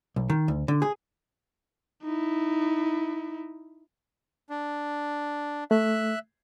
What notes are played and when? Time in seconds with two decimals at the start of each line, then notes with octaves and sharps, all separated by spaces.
0.16 B1
0.30 D#3
0.48 D2
0.68 D3
0.82 G#4
2.03 D#4 E4
4.50 D4
5.71 A3 E5 F#6